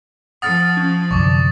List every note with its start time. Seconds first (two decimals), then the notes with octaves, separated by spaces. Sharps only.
0.42 F3 F#5 D#6 F6 A6
0.77 C#4
1.11 C2 F#2 D3 C#6 D6